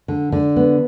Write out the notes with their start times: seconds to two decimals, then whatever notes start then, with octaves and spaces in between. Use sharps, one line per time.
0.08 D3
0.32 D3
0.56 B3